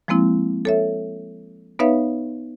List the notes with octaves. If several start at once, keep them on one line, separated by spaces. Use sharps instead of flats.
F3 G#3 A#3 C4 E4
A4 C#5 E5
B3 D#4 B4 C#5 E5 F5